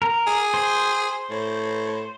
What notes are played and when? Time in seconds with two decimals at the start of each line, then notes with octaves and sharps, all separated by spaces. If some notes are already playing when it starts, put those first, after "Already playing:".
0.02 A#4
0.27 G#4
0.54 C5
1.30 A2